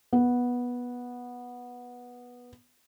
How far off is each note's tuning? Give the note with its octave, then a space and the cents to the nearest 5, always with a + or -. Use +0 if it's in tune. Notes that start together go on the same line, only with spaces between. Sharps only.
B3 -10